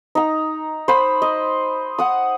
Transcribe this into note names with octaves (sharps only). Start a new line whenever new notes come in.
D#4 A#5
C5 B5
D#5
F#5 D#6